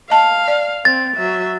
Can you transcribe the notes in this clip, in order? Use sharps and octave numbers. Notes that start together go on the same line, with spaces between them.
D#5 F5 A5
D5
C4 A6
F#3 E5